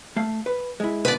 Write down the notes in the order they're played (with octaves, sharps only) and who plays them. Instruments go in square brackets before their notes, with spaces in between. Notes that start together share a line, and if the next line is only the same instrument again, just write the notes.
[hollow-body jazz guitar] A3 F5
B4
G#3 E4
[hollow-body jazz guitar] D2 G#2 B2 [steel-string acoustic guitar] B4 D5